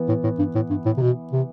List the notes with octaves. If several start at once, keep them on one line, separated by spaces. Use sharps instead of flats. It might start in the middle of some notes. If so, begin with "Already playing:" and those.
Already playing: E3 B3
A2
A2
G2
A2
G2
A2
C3
B2
C3